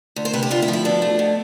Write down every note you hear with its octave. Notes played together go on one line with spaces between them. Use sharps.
D2
C5
C3 B4
G4
D2 F4
E4
F3
E4
B2 D4
A3
B2